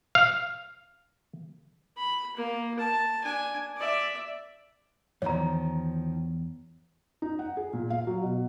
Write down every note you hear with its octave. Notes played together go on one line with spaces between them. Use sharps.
F5
B5
A#3
A5
D4 G#5
D5 E5
E2 G#2 D#3 F3 C#5 A#5
D#4
F#5
G#4
A#2
F5
F#3
B2